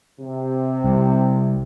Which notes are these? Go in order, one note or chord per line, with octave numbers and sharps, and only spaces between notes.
C3
C2